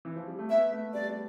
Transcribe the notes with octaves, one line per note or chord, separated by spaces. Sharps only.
E3
F3
G3
A3
B3 E5
A3
G3 D5
G3